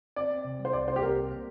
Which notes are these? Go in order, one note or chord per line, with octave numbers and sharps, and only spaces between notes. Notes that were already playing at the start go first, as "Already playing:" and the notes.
C4 D5
C4
C3
G3
C5
C2 D5
C3 C5
G4
C2 A#4
C4
A#3